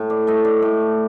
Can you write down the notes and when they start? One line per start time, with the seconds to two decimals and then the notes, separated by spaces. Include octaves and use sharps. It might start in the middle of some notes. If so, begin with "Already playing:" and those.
Already playing: A2
0.10 D5
0.27 A3 D#5
0.45 D5
0.62 A2